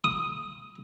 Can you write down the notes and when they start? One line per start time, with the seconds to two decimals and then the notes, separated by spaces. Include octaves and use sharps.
0.04 D#6